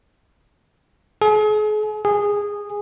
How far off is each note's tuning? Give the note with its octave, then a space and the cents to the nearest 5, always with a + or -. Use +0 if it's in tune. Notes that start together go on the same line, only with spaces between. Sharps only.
G#4 +40
G#4 -15